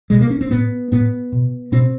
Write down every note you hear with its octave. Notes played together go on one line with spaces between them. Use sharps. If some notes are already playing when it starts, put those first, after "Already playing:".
B2 G#3
A#3
C#4
C4
A2 B3
A2 B3
B2
B2 C4